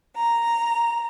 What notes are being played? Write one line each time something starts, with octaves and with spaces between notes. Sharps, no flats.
A#5